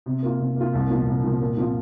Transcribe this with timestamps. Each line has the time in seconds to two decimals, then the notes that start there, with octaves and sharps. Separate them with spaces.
0.06 C3
0.23 A#3 F4
0.39 C3
0.56 A#3 F4
0.73 C2
0.90 A#2 F3
1.07 C2
1.23 A#2 F3
1.41 A#2
1.57 F3 C4 F4